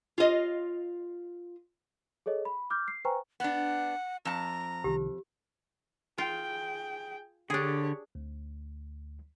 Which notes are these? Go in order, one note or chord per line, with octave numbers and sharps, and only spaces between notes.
F4 D#5
G#4 A4 C#5 D#5
B5
D6 F6 G6
C7
B4 C5 G5 G#5 A#5 C#6
B3 D4 F#5
F2 A5 A#5
C2 D#3 G4
F4 G#4 G5
D3 D4 G4 G#4 C#5
D2